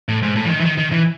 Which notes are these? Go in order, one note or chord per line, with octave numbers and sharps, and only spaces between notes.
A2
G#2
A2
E3
D#3
E3
D#3
D#3
E3